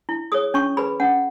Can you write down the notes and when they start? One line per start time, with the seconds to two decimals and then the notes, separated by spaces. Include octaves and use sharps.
0.09 E4
0.32 G#4 C#5 D#6
0.54 C#4 C#6
0.77 G#4 B4 B5
1.00 C#4 F#5